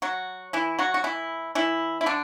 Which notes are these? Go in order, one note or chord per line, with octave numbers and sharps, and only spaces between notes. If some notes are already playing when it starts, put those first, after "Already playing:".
F#3 F#4
E3 E4
F#3 F#4
F#4
E3 E4
E3 E4
E4
D3 D4